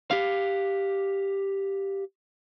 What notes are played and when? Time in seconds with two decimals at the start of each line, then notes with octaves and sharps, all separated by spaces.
0.11 G4 F5